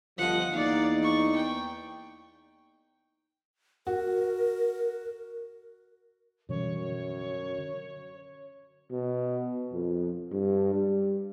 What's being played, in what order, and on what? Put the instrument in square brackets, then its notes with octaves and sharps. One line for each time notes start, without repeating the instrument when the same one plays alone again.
[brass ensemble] G1 F3 [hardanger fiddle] D#5 F#5
[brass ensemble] E2 A#3 D#4 [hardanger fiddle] D5 F5
[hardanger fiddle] C#6
G5
[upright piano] F#4 [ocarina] A#4
[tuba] F#2 [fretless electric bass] B2 E3 G3 [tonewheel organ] D3 [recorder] C#5
[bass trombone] B2
F2
G2
G3